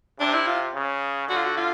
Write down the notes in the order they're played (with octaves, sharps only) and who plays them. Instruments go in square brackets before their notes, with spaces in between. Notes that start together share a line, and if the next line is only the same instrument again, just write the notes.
[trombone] C3 [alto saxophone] D4
[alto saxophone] E4
F4
[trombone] C#3
[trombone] D3 [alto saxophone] F#4
[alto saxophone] F4
F#4
F4